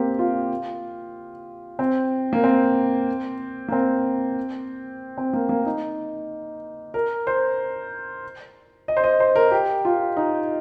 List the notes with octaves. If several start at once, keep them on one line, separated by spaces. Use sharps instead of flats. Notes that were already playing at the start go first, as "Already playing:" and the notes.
Already playing: A#3 C4 G4
F4
C4
A#3
C4
A#3
C4
C4
A#3
A#3
D#4
A#4
C5
D#5
C5
D#5
C5
A#4
G4
F4
D#4